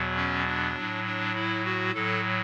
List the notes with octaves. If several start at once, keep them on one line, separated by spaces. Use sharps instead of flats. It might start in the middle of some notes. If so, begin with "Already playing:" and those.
Already playing: E2 B2 F#3
C#4
D4
A2 F#3
D4
E4
F#4
A2 F#3 A4